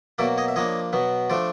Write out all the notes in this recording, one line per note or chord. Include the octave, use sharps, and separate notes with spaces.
B2 F#3 A#3 D5 E5
C#5 D#5
E5
F3 A#3 D4 C#5 D#5
B2 F#3 B3
F3 A3 D4 C5 D5